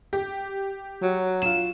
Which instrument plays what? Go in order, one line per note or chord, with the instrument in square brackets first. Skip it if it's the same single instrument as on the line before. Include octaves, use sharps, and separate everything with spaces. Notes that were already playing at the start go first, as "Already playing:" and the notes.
[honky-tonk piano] G4
[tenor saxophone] F#3
[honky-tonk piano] F4 E7